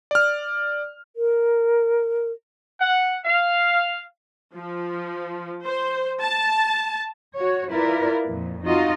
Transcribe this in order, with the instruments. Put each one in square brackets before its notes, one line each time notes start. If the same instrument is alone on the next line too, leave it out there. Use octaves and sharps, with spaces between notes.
[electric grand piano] D5 F6
[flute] A#4
[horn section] F#5
F5
[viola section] F3
C5
A5
[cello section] F#4 C#5
E4 F4 A#4 B4 D5
F2 A#2
D#4 F4 F#4 D#5